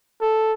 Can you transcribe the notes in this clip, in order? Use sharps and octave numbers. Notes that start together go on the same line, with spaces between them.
A4